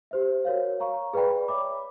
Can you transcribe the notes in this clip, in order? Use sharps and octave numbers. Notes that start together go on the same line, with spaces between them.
G4 C5 E5
F#4 A#4 C#5 F5
C#5 F5 A#5 C#6
G#4 B4 D5 G5 B5
C#5 E5 G5 B5 D6